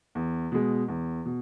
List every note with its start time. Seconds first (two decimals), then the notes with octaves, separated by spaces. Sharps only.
0.15 E2
0.52 B2 G#3
0.88 E2
1.25 B2